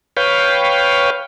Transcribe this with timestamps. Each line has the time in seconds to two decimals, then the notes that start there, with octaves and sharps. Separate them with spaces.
0.17 B4 C#5 F5 G5